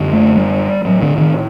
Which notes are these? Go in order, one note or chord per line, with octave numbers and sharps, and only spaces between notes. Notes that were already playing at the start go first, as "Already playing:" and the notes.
Already playing: F#2 D3
A3
G3
A2 F#3
D3
D#3